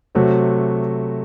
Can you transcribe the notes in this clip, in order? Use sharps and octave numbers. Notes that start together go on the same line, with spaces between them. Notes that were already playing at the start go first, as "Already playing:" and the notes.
C3 F#3 A3 C4 F#4